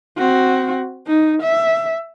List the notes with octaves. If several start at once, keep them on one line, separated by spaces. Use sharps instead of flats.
C4 F#4
D#4
E5